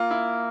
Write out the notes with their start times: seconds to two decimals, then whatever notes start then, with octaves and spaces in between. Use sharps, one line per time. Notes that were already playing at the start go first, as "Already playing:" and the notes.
Already playing: A#3 F4
0.11 E4